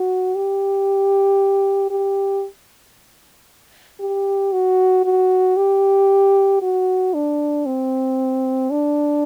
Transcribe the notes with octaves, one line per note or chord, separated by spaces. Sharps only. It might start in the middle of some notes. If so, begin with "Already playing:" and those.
Already playing: F#4
G4
G4
G4
F#4
F#4
G4
F#4
D4
C4
D4